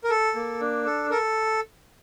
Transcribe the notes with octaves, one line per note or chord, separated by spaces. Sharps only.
A#4
A4
A#3
D4
A4
A4 A#4